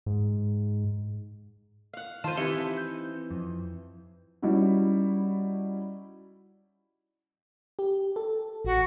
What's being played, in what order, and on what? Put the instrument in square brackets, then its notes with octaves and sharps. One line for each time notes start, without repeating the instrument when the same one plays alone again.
[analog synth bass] G#2
[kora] F5 F#5
[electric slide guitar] D#3 [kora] F4 C5 [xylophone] A5 C6 D#7
[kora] E3 E4 [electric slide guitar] C4 D#4 [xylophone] G4 C6 C#7
[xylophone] G6
[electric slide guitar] F2
[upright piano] G3 C#4 D#4 E4 F#4
[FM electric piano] G4
A4
[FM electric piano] A1 [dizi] F#4